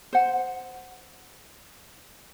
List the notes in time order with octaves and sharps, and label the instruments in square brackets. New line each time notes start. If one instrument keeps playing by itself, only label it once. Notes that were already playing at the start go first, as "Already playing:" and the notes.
[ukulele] C5 F#5